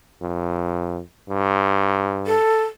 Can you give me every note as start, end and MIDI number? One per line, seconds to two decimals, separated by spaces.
0.22 1.00 41
1.28 2.36 43
2.26 2.63 69